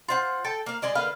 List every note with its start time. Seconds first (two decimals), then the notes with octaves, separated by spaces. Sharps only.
0.08 F4 C5 F#5
0.44 A4 G5 A5
0.66 A#3 F5
0.82 G#3 G#4 D5 D#5
0.95 D3 A#3 B4 F5